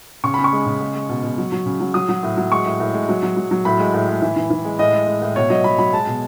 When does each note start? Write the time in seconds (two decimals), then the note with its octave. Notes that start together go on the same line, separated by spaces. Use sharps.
0.24 C#3 C#6
0.34 C#3 B5
0.44 C#6
0.53 G#3
0.66 C#3
0.81 G#3
0.95 G#3
1.09 B2
1.23 B2
1.38 F#3
1.52 F#3
1.66 C#3
1.80 F#3
1.94 F#3 D#6
2.09 F#3
2.23 A2
2.37 F#3
2.52 G#3 C#6
2.66 A2
2.80 A2
2.94 G#3
3.09 F#3
3.23 F#3
3.36 F#3
3.51 F#3
3.65 A2 B5
3.79 G#3
3.94 A2
4.08 G#3
4.22 E3
4.36 E3
4.50 E3
4.65 G#3
4.79 A2 D#5
4.93 G#3
5.07 G#3
5.22 A2
5.36 B2 C#5
5.50 F#3 D#5
5.64 F#3 B5
5.79 F#3 B5
5.93 G#3 A5
6.07 B2